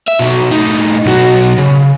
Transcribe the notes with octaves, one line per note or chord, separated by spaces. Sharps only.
E5
B2 F#3
A2 D#4
B1 F#4
C#3